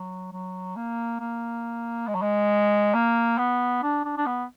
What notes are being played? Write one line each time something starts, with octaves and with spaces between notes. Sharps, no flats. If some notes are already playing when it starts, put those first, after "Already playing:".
Already playing: F#3
F#3
A#3
A#3
G#3
F#3
G#3
A#3
B3
D4
D4
D4
B3